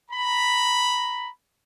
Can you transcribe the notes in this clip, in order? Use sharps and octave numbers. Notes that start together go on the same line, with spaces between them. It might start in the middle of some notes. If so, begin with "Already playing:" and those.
A#5 B5